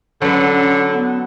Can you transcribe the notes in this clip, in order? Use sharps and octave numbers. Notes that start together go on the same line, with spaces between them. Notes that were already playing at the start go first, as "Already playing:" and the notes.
D3 F#3 C#4 B4
C#4
B3